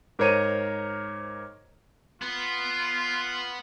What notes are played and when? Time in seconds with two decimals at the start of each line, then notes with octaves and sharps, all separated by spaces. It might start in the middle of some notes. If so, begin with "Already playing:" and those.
0.19 G#2 A#4 C5 C#5 A#5 D#7
2.22 B3 F4